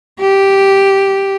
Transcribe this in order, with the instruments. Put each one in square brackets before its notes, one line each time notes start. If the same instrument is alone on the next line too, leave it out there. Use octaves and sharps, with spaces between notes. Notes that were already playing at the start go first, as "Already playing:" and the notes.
[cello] G4